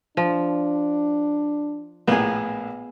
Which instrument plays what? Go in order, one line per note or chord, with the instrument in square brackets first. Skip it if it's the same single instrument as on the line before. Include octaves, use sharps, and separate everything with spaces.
[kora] F3 [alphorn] D4
[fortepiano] A#1 A2 A#3 [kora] B3 G#4